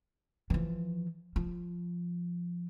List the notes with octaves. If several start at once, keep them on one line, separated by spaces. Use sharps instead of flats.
E3 F3
F3